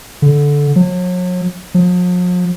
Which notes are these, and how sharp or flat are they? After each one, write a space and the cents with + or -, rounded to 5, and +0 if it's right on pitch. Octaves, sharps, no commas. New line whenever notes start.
D3 -15
F#3 -40
F3 +45